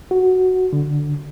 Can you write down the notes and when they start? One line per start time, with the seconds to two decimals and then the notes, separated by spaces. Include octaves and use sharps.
0.11 F#4
0.73 D3